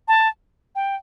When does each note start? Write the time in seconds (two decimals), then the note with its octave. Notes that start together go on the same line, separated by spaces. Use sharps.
0.08 A5
0.75 G5